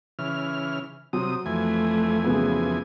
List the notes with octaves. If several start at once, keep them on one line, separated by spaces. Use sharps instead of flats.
C#3 E3 F6
C3 F#3 D#6
F2 E3 A3 G#5
C#3 F#3 B3